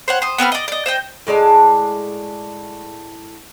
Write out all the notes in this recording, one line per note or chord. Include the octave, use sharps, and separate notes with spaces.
C5 C#5 F#5
C5 D#6
B3 C4 B4 F6
D5 D#5
D5 D#5
C5 D#5 G5
A2 G#3 D5 A5